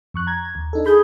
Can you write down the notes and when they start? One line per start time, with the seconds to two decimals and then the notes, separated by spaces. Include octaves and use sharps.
0.14 F2 C#6 F#6
0.27 A#5 G#6
0.55 D#2
0.73 D4 D#4 A4
0.86 G#4 B5 G6